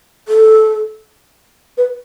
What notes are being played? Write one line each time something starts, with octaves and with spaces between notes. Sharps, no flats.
A4
B4